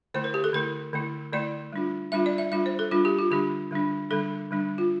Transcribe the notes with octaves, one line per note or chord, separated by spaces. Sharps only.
D3 A3 E4 C5
A#4
G4
A4
D3 A3 E4 A#4
D3 A3 E4
D3 A3 E4 D5
G3 D4 F4
G3 D4 F4 E5
D5
E5
G3 D4 F4 E5
C5
A4
G3 D4 F4
G4
F4
D3 G3 D4 G4
D3 G3 D4
D3 G3 D4 A4
D3 G3 D4
F4